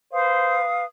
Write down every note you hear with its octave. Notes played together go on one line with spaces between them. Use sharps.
B4 C5 F5 D#6